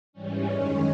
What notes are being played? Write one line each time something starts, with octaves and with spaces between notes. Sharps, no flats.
G#2 E3 G3 C#4
F#2 D#3 G#3